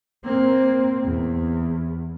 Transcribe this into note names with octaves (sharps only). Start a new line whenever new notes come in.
A#3 C4
E2